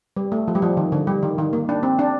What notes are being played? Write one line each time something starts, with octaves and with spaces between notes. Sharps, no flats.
G3
A3
F3
G3
F3
D#3
D3
G3
D#3
D#3
A#3
D4
C4
D4